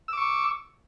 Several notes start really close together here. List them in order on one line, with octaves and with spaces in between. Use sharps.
E6 D6 C#6